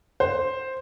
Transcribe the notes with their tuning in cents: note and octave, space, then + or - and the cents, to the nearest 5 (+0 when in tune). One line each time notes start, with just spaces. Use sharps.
C5 +5